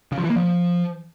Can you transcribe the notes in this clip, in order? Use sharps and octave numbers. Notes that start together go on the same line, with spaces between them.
C#3
F3
E3
A#3
F3